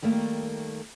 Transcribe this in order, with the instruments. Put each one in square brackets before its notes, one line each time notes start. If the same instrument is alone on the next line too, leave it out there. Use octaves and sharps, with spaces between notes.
[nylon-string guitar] D#3 G3 A3 A#3